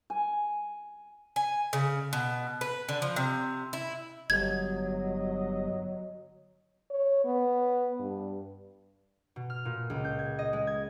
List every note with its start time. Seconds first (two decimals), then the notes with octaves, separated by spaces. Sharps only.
0.10 G#5
1.36 G#5
1.73 C#3
2.13 B2
2.61 B4
2.89 D3
3.02 F3
3.16 C3
3.73 E4
4.30 G1 F#3 D#5 G#6
6.90 C#5
7.25 B3
7.99 G2
9.36 B2
9.50 F6
9.65 A#2
9.90 C#2
10.05 G6
10.19 G#6
10.39 D#5
10.53 G#3
10.67 G#6